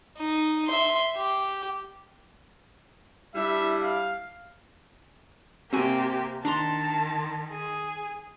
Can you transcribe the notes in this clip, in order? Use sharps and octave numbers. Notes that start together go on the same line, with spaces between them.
D#4
E5 C6
G4
G3 D4 E4 E5
F5
C3 A#3 C4 F#4 G4 G#5
D#3 D4 A5 A#5 C6
G#4